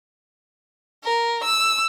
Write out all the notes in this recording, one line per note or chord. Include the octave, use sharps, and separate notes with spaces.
A#4
E6